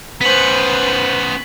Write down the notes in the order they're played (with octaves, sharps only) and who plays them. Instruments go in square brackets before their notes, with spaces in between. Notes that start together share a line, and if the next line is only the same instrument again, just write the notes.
[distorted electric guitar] B3 C#4 [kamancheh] B4 C5 [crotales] B6 F#7